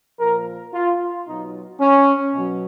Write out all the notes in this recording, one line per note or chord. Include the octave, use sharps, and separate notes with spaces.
A#2 F3 A#4
F4
B2 F#3 D#4
C#4
B2 F#3